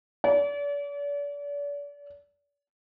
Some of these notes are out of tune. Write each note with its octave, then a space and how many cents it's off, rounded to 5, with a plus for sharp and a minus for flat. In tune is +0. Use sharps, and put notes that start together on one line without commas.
D5 -40